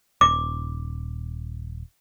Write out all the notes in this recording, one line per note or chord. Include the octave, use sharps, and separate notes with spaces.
D#1 D6